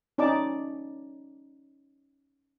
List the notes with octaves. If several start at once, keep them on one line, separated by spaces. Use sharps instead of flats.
C#4 D#4 D5 A5 D6